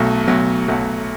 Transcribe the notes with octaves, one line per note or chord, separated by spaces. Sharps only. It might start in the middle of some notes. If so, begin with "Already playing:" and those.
Already playing: B1 B2 F#3 A3
B1 B2 F#3
B1 B2 F#3 A3